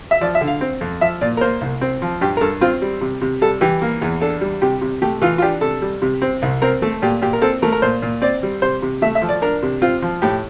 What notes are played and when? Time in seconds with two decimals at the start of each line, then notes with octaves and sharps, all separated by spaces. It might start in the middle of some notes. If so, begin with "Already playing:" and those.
0.11 E5
0.21 F3 D5
0.35 E5
0.41 D3
0.47 F5
0.61 C4
0.81 F2
1.01 F3 E5
1.21 A#2 D5
1.37 A#4
1.41 A#3 C5
1.61 C2
1.81 C4
2.02 F3
2.21 G2 G4
2.37 A#4
2.41 G2 A4
2.61 C4 F4
2.82 G3
3.01 C3
3.21 C3
3.41 G3 A4
3.61 E3 G4
3.82 A#3
4.01 E2
4.21 D4 A4
4.41 G3
4.62 C3 G4
4.81 C3
5.02 A3 G4
5.21 E3 F4
5.38 F4
5.42 D4 G4
5.61 C3 A4
5.82 G3
6.02 C3
6.22 C4
6.42 C2
6.62 C4 A#4
6.82 A3 A4
7.02 A#2 G4
7.22 A#2 G4
7.33 A#4
7.42 C4 A4
7.62 A3 A#4
7.72 A#4
7.82 A#2 C5
8.02 A#2
8.22 C4 D5
8.43 G3
8.62 C3 C5
8.82 C3
9.02 A3 E5
9.15 E5
9.22 F3
9.29 D5
9.42 D4 A#4
9.62 C3
9.82 C4 F4
10.02 F3
10.22 A2 G4